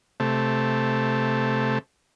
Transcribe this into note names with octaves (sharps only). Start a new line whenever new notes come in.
C3 A3